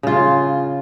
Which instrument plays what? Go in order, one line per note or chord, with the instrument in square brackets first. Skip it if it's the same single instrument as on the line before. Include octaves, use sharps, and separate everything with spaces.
[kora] C#3 F4